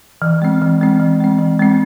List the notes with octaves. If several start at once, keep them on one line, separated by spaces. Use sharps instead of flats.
E3
G#3 C4
E3
G#3 C4
E3
G#3 C4
E3
G#3 C4